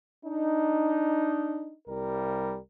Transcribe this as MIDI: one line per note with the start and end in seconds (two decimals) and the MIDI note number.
0.25 1.72 62
0.25 1.72 63
1.86 2.58 36
1.86 2.58 55
1.86 2.58 70